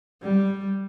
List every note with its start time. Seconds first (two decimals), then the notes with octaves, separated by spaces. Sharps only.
0.22 G3